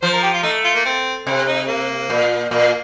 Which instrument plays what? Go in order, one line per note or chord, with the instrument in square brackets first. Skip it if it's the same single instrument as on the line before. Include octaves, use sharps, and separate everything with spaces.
[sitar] F3 [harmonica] C5
[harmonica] A#4
G4
F4
[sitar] A3 [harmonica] D#4
[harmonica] F4
A#3
C4
[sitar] C3 [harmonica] C4
[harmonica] D#4
A#3
[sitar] A#2
[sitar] A#2 [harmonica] A#3